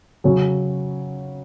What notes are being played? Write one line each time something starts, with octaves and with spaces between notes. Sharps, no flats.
C#3 F#3 C#4